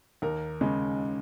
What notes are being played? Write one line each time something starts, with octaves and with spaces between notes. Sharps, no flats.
D#2 A#4
C#3 G#3